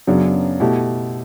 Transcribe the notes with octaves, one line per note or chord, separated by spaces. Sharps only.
F#2 C#3 F#3 B3 D4
B2 A3 E4 G4